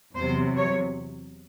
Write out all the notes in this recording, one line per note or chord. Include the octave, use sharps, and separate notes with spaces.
E2 C3 F#3 C5
C#5